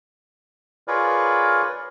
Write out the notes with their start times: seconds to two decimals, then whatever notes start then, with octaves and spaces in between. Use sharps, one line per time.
0.88 F4 G#4 A#4 B4 C#5 D5